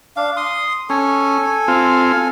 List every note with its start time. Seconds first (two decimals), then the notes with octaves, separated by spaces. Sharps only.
0.16 D4 F5
0.37 C6 D#6
0.90 C#4 A4 G#5
1.68 C4 F4